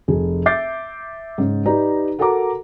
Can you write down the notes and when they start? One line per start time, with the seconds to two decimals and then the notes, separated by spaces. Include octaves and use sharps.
0.08 F1 G#4
0.46 E5 D6 G6 A6 C7
1.38 G#2 C#3
1.66 D#4 G4 B4 D5 A#5
2.19 F#4 A4 A#4 F#5 A#5 D6